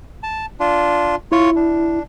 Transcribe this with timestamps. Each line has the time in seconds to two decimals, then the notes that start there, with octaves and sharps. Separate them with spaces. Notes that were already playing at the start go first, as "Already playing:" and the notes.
0.23 A5
0.60 D4 F4
1.32 E4 F4 C#5
1.56 D4